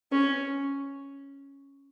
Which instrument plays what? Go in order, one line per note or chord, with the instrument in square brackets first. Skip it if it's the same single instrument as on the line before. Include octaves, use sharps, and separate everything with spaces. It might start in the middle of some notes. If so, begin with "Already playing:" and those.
[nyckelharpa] C#4